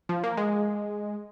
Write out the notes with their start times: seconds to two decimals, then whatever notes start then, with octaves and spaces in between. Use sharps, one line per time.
0.09 F3
0.24 A#3
0.37 G#3